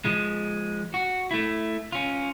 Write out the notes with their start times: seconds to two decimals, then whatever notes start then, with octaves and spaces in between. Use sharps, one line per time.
0.05 F3 G#3
0.94 F#4
1.31 A3 E4
1.92 C#4 F4